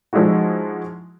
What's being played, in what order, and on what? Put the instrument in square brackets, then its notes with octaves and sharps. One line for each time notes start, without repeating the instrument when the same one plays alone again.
[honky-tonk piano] F3 F#3 G#3 D#4 E4 F#4